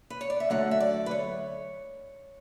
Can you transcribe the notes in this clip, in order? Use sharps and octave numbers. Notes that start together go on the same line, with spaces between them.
B4
C#5
D5
E5
D3 F#3 A3 F#5
E5
D5
B4
C#5